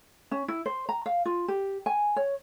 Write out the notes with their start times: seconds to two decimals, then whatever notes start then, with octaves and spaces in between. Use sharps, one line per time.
0.31 C#4
0.48 E4
0.66 C5
0.89 A#5
1.06 F5
1.25 F4
1.48 G4
1.86 G#5
2.16 C#5